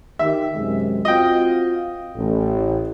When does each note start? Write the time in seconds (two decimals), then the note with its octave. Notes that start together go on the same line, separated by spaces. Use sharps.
0.19 D#3 G4 E5
0.56 F#2 C3 G#3
1.05 C4 F4 F#4 D#5 G5
2.15 A1